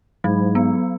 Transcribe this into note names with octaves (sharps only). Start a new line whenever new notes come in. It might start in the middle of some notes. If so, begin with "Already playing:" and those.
G#2 F#3
B3